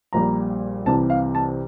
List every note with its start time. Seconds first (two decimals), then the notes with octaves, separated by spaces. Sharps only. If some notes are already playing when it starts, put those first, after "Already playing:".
0.13 A#1 A#2 G3 A#5
0.86 C2 C3 E3 A5
1.10 F5
1.35 A5